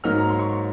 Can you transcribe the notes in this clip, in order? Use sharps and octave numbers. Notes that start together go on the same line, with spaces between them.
G#2 F#3 A#3 D#4 F6
A#5
C6
C#6